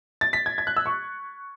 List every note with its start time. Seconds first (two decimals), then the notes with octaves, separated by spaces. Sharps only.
0.21 A6
0.33 B6
0.46 G#6
0.58 G#6
0.67 F#6
0.77 E6
0.86 C#6